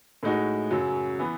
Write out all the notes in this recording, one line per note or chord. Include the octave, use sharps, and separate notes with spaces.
A2 G#3 D#4 F#4
F#2 C#3 F#3
E3 B3